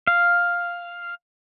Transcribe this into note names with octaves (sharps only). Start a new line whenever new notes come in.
F5